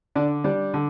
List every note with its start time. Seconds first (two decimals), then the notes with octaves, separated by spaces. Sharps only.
0.16 D3 D4
0.44 G3 D4
0.74 D3